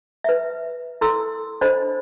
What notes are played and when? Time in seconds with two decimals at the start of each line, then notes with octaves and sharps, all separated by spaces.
0.24 B4 E5
1.01 E4 A4 C6 E6
1.61 D4 A4 C5 D#5 B5